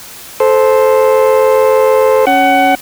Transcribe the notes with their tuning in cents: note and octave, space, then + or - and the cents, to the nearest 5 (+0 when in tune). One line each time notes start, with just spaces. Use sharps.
A4 -15 C5 +0
C#4 +0 F#5 +25